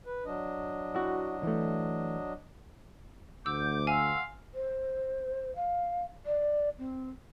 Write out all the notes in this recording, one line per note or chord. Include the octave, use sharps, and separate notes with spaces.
B4
F#3 D4 D#5
E4 F#4
E3 A3
D2 F#5 D6 E6 G6
F5 F#5 G#5 C6 E6
C5
F5
D5
C4